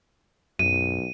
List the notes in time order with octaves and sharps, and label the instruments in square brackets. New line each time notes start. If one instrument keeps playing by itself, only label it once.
[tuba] B1 [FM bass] F#2 [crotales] D#7